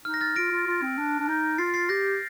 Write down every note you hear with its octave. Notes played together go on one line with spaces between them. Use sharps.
D#4 F6
A#6
F6 A6
F4 A#6 D7
F4
F4
C4
D4
D4
D#4
F4 A6 C7
A6 C7
G4 G6 A#6